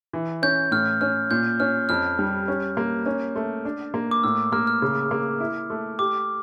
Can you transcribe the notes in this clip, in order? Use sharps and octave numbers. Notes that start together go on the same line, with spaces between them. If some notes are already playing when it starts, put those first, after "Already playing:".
E3
C#4 G6
A2 F6
C#4 F6
A#2 G6
C#4 F6
F2 F6
G3
C#4
A#3
C#4
A3
D4
A#3
D6
A2 E6
A#3 F6
F6
C#3
A#3
E4
A3
G4 D6